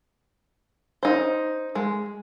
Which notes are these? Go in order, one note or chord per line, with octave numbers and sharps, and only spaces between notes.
D#4 C5
G#3